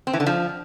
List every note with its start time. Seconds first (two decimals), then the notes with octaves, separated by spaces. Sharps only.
0.07 C4
0.13 E3
0.20 D3
0.26 F3